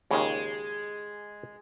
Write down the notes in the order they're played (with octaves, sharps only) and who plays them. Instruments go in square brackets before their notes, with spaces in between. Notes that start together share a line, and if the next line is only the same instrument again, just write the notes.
[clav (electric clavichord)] D#2 A#2 C#3 [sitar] G#3